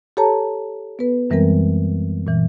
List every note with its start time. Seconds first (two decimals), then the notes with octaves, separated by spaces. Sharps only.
0.17 G4 A4 C#5 A5 A#5
0.99 B3 B4
1.30 F#2 E3 G3 G#3 C4 A#4
2.27 A#2 E3